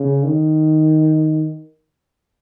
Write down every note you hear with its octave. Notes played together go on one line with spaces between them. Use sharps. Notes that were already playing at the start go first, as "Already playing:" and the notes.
Already playing: C#3
D#3